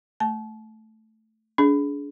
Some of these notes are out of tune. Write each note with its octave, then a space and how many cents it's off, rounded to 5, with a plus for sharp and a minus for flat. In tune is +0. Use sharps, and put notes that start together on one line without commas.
A3 +0 A5 -30
D4 -35 G#4 +20